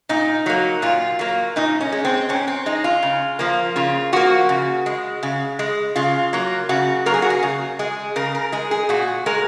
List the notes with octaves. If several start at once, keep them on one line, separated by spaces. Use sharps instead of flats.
A#2 D#4
F#3 A#3
A#2 F4
F#3 A#3
A#2 D#4
C#4
G#3
C4
A#2 C#4
C4
G#3 D#4
F4
C#3
F3 A#3
C#3 F4
F3 A#3 F#4
C#3
G#3
C#3
G#3
C#3 F4
F#3 A#3
C#3 F#4
F#3 A#3 A#4
G#4
F#4
G#4
C#3
G#3 G#4
C#3 A#4
A#4
G#3 G#4
G#4
A#2 F#4
G#3 A#4